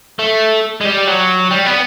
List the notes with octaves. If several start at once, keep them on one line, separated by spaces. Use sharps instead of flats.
A3
G#3
G3
F#3
G3
B3